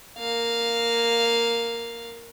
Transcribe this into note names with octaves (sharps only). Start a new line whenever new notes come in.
A#3 F5